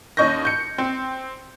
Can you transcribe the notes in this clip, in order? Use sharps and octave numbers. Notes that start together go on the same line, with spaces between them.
D#2 C#4 D#5 C#6 G6 A#6
G6 C#7
C4